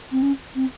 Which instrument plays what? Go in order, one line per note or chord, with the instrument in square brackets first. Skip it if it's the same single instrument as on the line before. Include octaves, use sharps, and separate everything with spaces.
[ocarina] C4
C#4
C4